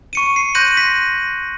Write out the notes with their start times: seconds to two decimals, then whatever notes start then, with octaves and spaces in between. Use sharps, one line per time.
0.13 C#6 C#7 D#7
0.36 C7
0.55 C6 F#6 G6 A#6 D#7 F#7
0.77 B6